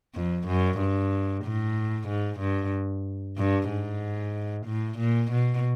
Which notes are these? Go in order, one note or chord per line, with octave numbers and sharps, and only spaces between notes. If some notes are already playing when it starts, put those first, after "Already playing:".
F2
F#2
G2
A2
G#2
G2
G2
G#2
A2
A#2
B2